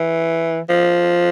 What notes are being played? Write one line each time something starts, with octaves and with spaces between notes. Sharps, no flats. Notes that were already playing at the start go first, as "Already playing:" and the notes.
Already playing: E3
F3